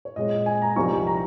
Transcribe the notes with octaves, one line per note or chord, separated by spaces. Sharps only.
C#5
A#2 G#3 C4 D#5
G#5
A#5
C2 C3 F3 C4 D#4 C#6
A#5